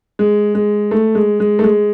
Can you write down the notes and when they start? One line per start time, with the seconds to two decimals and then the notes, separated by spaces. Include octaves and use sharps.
0.19 G#3
0.55 G#3
0.91 A3
1.15 G#3
1.40 G#3
1.59 A3
1.64 G#3